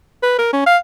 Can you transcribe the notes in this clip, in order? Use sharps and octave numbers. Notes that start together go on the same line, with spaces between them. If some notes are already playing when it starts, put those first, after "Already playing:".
B4
A#4
C#4
F5